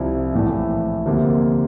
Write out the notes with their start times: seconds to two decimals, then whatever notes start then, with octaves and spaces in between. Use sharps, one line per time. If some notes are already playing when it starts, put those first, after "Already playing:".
Already playing: C2 C3 F3 C4 E4
0.34 A#1 A2 E3 A3
1.06 D2 C3 F3 A#3 F4